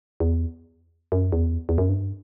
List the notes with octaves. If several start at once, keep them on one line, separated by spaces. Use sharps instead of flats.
E2
F#2
E2
E2
F#2
G2